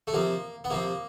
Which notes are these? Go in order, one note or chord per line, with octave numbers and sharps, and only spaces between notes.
A3
C3 F3 A#3
B3
C3 F3 A#3